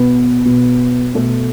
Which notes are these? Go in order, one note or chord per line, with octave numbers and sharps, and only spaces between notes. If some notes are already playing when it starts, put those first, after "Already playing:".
Already playing: B2 B3 B4
B2
B2 A3 A4